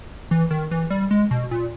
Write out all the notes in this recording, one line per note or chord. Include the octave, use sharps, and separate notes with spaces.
E3
D#3
E3
G3
G#3
B2
A#2